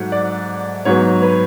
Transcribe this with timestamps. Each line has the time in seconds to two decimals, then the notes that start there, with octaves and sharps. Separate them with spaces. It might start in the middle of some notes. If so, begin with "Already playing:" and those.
Already playing: G#2 F#3 A3 F#5
0.12 D5
0.85 G#2 F#3 B3 C#5
1.22 B4